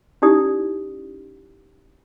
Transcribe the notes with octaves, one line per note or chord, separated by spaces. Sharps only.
C#4 D#4 E4 G4 D5 D#6